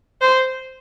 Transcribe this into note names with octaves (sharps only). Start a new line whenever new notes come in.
C5